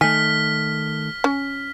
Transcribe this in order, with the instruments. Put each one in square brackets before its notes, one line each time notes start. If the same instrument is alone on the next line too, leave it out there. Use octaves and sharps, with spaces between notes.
[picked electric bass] D#3 A3 [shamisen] G#5 [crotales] F6 B6
[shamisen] C#4